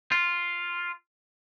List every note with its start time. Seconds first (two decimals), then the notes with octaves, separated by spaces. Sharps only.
0.12 F4